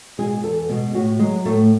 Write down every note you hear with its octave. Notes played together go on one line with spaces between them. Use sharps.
B2 G#3 G#4
E2 A4
B2 G#3
A2 F#4
F#3 G#3
A2 A3